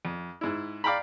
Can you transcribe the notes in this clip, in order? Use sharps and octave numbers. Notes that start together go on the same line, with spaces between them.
F2
G#2 E4
D5 F5 G5 A#5 B5